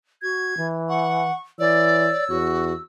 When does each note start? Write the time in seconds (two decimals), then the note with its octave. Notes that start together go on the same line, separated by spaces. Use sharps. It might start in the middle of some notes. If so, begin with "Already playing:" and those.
0.22 F#4 G#6
0.56 E3
0.89 F#5 C#6
1.59 E3 C#5 D5 E6
2.29 E2 F#4